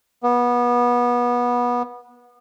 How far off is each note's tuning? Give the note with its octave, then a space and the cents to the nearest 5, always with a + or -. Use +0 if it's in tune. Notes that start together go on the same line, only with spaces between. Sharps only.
B3 -25